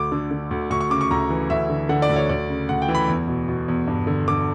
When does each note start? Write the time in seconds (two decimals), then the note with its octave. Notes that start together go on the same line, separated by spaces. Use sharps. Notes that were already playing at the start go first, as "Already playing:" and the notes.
Already playing: D2 D6
0.12 D3
0.31 D3
0.51 D2
0.70 D2 C#6
0.81 C#6
0.90 C#3 D6
1.01 C#6
1.11 D2 A#5
1.30 E3
1.50 D2 E5
1.69 D3
1.89 D3 F#5
2.02 D5
2.09 D2
2.16 C#5
2.29 D2 D5
2.49 C#3
2.69 D2 F#5
2.82 G5
2.88 E3
2.95 B5
3.08 E2
3.28 B2
3.48 B2
3.68 E2
3.88 G2
4.07 D3
4.28 D3 D6